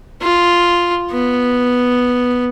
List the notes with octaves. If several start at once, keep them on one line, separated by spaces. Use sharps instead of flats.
F4
B3